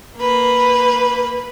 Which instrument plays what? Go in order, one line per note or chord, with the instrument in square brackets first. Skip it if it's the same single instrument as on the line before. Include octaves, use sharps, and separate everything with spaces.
[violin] A#3 B4